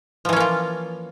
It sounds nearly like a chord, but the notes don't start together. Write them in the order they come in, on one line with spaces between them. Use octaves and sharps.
F3 E3 C#4 A#3 F4